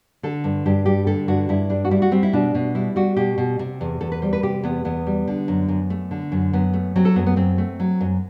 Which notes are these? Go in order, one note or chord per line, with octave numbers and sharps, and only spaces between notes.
D3 A4
G2
G2 G4
G3 G4
D3 A4
G2 F#4
G2 E4
G3 D4
F#4
G3 E4
F#4
G3 C4
E4
B2 D4
B2
G3 E4
G3 F#4
B2 G4
B2
C3
E2
E2 A4
B4
G3 C5
B4
C3 G4
E2 B3
E2 B3
G3
D3
F#2
F#2
A3
D3
F#2
F#2 B3
A3
F#3 C4
A4
F#2 B3
B3
F#2 C4
A3
F#3
F#2